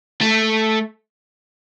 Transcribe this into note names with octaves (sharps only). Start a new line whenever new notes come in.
A3